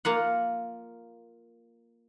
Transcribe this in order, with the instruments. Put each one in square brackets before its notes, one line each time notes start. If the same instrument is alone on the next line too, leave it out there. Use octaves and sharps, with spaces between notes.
[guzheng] A#3 F4 F#5